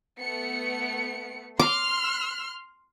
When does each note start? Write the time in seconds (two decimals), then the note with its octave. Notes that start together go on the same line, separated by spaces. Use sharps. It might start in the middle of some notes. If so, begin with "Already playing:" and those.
0.20 A3 B3 C#7
1.60 C6 D6 F6